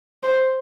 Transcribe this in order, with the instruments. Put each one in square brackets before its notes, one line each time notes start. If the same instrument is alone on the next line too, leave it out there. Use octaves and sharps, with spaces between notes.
[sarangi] C5